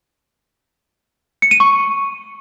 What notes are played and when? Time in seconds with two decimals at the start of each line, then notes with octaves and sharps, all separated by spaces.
1.42 C#7
1.51 D#7
1.60 C#6